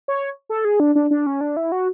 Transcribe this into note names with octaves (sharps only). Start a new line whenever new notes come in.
C#5
A4
G#4
D4
D4
D4
C#4
D4
E4
F#4